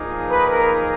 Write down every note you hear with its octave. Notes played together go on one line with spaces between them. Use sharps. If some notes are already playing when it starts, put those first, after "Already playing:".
Already playing: A#2 F3 A#3 D#4 G#4
B4
A#4